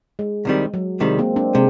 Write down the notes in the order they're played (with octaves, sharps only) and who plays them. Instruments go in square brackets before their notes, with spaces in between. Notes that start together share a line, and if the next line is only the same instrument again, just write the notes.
[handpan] G#3
[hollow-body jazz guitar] C2 C3 D#3 G3
[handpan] F#3
[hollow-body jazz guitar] C2 C3 D#3 G3 [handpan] G#3
[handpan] A#3 C4
C4 D4
[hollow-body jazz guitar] C3 [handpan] G#3